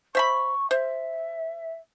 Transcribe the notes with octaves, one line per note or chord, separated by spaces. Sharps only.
C5 E5 B5 C#6
C5 E5